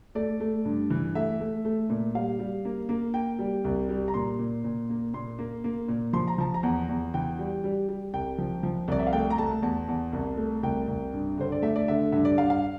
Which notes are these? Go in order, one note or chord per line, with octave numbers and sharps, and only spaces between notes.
A3 D5
A3
G2
E3
A3 E5
A3
A3
A#2
G3 F5
G3
A#3
A#3
A#3 G5
G3
C2
G3
A#5
A#2 C6
A#2
A#2
A#3
A#2 C6
A#3
A#3
A#2
F3 C6
A#5
F3 A5
A#5
E2
E2
E3 G5
G3
G3
G3
C2 G5
F3
F3
C2 D5
E5
F5
A3 G5
A#5
A3 A5
E2 A5
E2
C2
A3
C2 G5
C2
G2
D3 C5
D5
A3 E5
D5
D3 E5
G2 E5
D5
G2 F5
F5